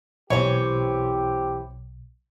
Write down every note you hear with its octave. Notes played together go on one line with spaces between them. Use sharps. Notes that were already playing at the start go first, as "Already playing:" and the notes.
B1 E3 C4 G4 C5 C#5